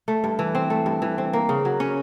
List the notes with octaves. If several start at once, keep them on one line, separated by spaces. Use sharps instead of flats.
A3
G2
E3
C4
A3
G2
E3
C4
A#3
C#3
F#3
C#4